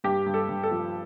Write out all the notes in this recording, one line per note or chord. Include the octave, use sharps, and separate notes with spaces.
G2 G4
G2
A4
G2
A4
F3